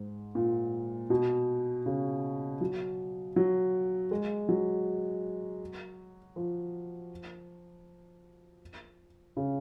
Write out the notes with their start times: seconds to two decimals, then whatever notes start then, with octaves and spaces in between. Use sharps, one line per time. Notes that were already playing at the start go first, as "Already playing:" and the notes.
Already playing: G#2
0.35 A#2
1.10 B2
1.86 C#3
2.61 F#3
3.36 F#3
4.11 G#3
4.49 F#3
6.36 F3
9.37 C#3